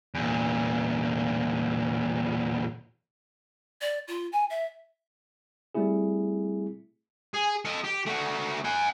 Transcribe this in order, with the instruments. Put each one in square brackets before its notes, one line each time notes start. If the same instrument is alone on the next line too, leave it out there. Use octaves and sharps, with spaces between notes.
[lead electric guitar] E2 A#2
[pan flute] D5
F4
G#5
E5
[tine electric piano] G3 A3 C4 E4 G#4
[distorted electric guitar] G#4
A4 D#5
G4
A3 F#4
F#5 G#5